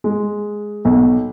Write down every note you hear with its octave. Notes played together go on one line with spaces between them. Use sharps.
G#3
B1